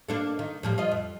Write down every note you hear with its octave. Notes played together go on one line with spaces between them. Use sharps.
A#3 D4 A4
D#3
A2 F3 G3
F4 D5 D#5
F2